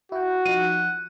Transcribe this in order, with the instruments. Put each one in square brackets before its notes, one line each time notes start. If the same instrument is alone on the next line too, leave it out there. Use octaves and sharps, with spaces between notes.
[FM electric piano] E4 G5 [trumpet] F#4
[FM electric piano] F3 D#4 [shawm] F#5 [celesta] D#7